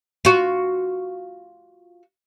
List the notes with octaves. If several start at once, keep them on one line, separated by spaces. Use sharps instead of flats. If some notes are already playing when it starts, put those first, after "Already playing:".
F4 F#4